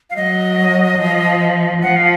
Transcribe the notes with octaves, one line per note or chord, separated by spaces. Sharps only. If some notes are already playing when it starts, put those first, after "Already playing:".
F5
F#3 D#5
F3
F3 F#5
F5